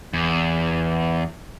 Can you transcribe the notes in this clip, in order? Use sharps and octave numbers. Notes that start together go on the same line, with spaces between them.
E2